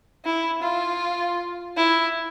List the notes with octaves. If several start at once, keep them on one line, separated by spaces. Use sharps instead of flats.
E4
F4
E4